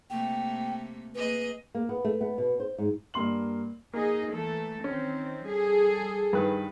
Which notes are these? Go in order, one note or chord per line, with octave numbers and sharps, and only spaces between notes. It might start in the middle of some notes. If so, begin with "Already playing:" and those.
C3 A3 A#3 G5
A#3 G#4 B4 D#5
A#3
B3
A3
B3
B2
C5
G#2
G2 A#3 C6 F#7
A#3 D#4 G#4 D#5
E3 A3 A4
D#3 C4 C#4
G3 G#4 A4
G2 D#3 B4